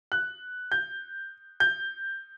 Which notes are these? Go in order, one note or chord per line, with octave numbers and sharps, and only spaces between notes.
F#6
G6
G6